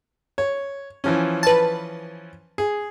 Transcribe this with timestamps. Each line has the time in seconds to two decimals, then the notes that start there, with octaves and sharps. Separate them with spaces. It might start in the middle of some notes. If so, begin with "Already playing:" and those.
0.38 C#5
1.04 E3 F3 C#4
1.43 B4 A5
2.58 G#4